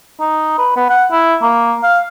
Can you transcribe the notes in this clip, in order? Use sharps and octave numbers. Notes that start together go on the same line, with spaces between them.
D#4
B4
B3
F#5
E4
A#3
F5